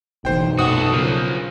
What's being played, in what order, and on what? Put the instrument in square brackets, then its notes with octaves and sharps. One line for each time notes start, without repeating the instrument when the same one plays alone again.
[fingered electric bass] F#1 A2 E3 [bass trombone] B1 [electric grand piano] C5 G5
[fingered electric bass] F#2 A#2 [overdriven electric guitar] F#4 A4 [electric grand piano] F#5 D#6
[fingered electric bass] C#3 [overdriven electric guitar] F3 A#3